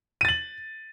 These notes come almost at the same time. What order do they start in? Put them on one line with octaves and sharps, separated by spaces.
D#7 A6 F#7